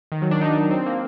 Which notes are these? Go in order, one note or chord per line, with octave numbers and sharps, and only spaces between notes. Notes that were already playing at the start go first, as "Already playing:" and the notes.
D#3
F#3
D4
D#4
C4
A#3